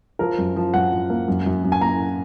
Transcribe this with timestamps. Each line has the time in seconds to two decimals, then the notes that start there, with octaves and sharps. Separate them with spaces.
0.19 F3 A#4
0.38 F#2
0.56 F3
0.74 F#2 F#5
0.92 F3
1.10 A#3
1.28 F#2
1.46 F#2
1.64 F#2
1.72 G#5
1.81 A#3 A#5